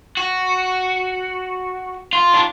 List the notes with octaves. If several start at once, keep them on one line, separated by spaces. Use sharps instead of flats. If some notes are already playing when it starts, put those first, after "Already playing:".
F#4
F4
D4